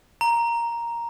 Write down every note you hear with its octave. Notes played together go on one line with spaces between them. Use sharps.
A#5